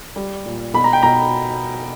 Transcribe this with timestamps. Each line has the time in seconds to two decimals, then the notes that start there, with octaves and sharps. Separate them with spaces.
0.16 G3
0.46 A#2
0.74 B2 B5
0.84 A#5
0.93 G5
1.02 B2 A#5